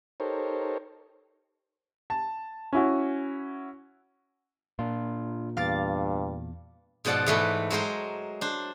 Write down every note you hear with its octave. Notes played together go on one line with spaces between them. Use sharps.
D#4 G4 A4 A#4 C5 C#5
A5
C#4 E4 F#4
A#2 D4 F4
E2 G2 F5 D6 A6
G#2 B2 F3 D5 F#5 A5
G#2 E3 A3 B4
F#3 G#3 A#4 C5
D4 C5